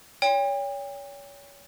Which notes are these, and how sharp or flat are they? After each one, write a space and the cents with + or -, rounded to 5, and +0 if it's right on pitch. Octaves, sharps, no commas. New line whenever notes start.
C#5 +30 G5 +35